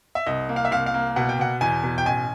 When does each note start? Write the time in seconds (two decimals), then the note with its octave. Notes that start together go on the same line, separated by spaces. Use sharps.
0.15 E5
0.26 C2 D#5
0.49 A#3
0.56 F5
0.65 E5
0.71 C2 F5
0.86 F5
0.94 A#3
1.16 B2 F#5
1.29 G5
1.39 B2 F#5
1.61 E2 G#5
1.83 B2
1.98 G5
2.06 A1 G#5